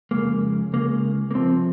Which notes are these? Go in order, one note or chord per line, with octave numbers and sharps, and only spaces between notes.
F2 C#3 G#3 A#3
C#2 C#3 G#3 A#3
A#3
C2 C3 F3 C4